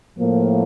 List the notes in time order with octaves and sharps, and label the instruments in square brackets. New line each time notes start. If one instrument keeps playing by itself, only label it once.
[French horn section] A2 F3 A#3